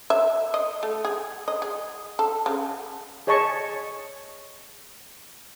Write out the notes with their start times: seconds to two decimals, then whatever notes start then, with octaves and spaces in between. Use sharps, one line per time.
0.10 E5
0.54 D#5
0.83 A3
1.05 G#4
1.48 D#5
1.62 G#4
2.19 A4
2.46 C#3
3.27 G#4 C#5 D#5 A5 C#6